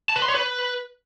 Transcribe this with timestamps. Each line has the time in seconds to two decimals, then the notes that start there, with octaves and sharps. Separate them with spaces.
0.10 A5
0.16 B4
0.22 C6
0.28 C#5
0.35 B4